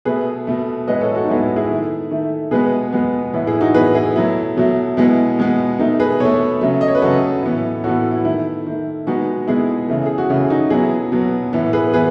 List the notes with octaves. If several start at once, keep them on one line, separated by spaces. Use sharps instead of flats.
B2 A3 G#4 B4
B2 A3
A2 G#3 B3 B4 D#5
A4 C#5
F#4 A4
D#4
A2 G#3 B3 E4
E4 G#4
D#3 A3
D#3 A3
B2 G#3 B3 G#4 B4
B2 G#3 B3
A2 E3 B3
E4 G#4
D#4 F#4
A2 E3 B3 G#4 B4
E4 G#4
B2 F#3 A3 E4
B2 F#3 A3
B2 G#3 B3 E4
B2 G#3 B3
B2 A3 D#4
G#4 B4
B2 A3 A4 C#5
C#3 F#3 A3
D#5
C#5
B4
C#3 F#3 A3 F#4 A4
A2 E3 B3
A2 E3 B3 F#4 A4
E4
D#3 A3 E4
D#3 A3
B2 G#3 B3 D#4 F#4
B2 G#3 B3 E4 G#4
C#3 E3 A3
G#4
F#4
C#3 E3 A3 E4
G#4
D#4 F#4
B2 F#3 B3 E4 G#4
B2 F#3 B3
A2 E3 B3
G#4 B4
E3 B3 G#4 B4